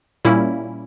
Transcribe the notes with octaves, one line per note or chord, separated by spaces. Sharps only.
A#2 G3 A#3 C#4 E4